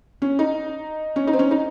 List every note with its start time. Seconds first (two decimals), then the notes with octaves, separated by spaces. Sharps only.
0.22 C#4
0.39 D#4
1.16 C#4
1.27 D#4
1.33 C4
1.39 C#4
1.51 D#4